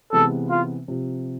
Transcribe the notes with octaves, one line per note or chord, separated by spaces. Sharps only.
C3 E3 G#3 B3 A4
F4
C3 F3